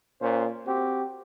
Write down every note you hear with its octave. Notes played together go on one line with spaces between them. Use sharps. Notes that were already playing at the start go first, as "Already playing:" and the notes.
A#2 C#4 C5
C4 F#4 G4